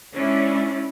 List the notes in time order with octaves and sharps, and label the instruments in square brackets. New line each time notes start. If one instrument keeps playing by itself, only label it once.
[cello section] G#3 C#4 D4 E4